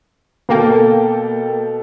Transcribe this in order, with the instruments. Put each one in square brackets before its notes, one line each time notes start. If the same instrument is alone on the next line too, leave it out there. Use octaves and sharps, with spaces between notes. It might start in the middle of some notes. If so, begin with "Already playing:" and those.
[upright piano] B2 A4 G5 [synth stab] A#3